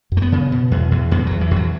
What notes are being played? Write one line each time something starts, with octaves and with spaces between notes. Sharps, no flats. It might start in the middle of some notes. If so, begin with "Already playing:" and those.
F#2
A3
B3
C#3
B2
E2
E2
E2 B3
E2 F#3
E3
E2
F#3